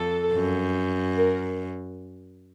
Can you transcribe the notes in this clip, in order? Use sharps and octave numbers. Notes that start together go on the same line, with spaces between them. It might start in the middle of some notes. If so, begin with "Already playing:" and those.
Already playing: F2 A4
F#2
A#4